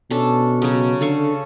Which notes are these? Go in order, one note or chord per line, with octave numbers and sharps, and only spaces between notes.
B2 C#4 D4 A4
C#3 F#3
D3 A4 F5 C#6